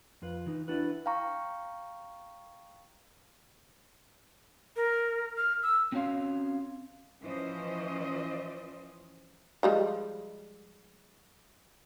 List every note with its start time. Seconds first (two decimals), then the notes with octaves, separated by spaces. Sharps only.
0.22 F2 F4 B4
0.46 E3 D#4
0.68 D4 E4 F#4 B4
1.06 F5 G5 A#5 C#6
4.76 A#4
5.37 F6
5.63 E6
5.92 C4 C#4 F#4 C#5 F5 C6
7.23 E3 F3 C#4 C5 D#5
9.63 F3 G3 G#3